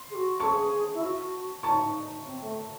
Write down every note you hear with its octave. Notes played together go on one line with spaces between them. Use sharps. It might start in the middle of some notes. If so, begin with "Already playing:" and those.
Already playing: C6
G#4
F#4
A4 A5 C#6
G#4
E4
F#4
E4 A5 C#6
D#4
C4
A3